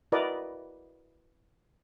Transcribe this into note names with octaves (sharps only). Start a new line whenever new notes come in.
E4 F#4 A#4 B4 D5 D#5